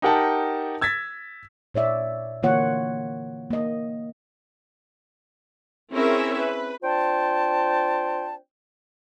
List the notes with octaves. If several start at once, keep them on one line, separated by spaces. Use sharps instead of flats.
D#4 G4 A#4 F#5 G5 A5
E6 G#6 A6 B6
A#2 C#5 D5 E5
D3 E3 A#3 F4 C#5 F#5
A#3 D#5
C4 C#4 E4 G#4 A#4 E5
B4
C4 D4 F4 C5 G5 A5